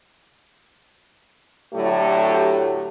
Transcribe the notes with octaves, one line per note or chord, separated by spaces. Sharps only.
A2 D3 F#3 A3 G4 A4